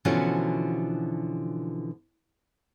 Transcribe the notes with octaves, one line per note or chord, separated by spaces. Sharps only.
B2 D3 E3 F3 C#4 F#4